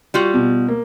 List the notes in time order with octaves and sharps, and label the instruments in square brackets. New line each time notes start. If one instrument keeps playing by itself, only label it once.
[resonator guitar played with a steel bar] G3 F4 F#4
[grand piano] B2
A#3